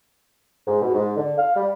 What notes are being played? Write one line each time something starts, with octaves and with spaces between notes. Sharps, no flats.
G#2
B2
G#2
D3
F5
G3